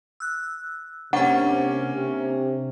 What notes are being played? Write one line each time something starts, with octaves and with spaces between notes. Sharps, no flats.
E6 F#6
C3 A#3 C#4 D4 C5 F#5 C#6
C3